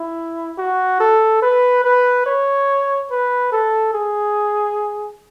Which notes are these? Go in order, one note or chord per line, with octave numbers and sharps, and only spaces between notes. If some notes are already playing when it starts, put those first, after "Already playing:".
Already playing: E4
F#4
A4
B4
B4
C#5
B4
A4
G#4